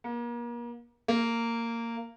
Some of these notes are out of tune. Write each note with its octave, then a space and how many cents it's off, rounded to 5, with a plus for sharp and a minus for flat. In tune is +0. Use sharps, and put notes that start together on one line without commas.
A#3 +35
A#3 -15